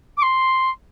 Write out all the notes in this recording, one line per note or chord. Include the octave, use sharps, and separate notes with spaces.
D6
C6